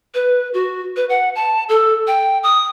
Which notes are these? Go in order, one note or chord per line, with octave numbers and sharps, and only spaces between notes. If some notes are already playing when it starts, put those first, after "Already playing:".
B4
F#4
B4
F#5
A5
A4
G5
D#6